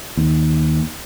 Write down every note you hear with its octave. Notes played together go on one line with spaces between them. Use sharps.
D#2